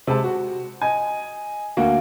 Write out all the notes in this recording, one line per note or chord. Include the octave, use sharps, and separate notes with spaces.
C3 G#3 A5
F#4
D#5 G#5
D2 A#3 F#4